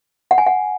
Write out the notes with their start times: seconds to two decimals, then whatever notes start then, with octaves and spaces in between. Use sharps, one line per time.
0.31 F#5
0.38 G#5
0.47 F#5